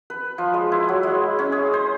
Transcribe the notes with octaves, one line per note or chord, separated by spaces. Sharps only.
B4
F3
G#3
E4
F#3
G#3
C#4
G#4
C5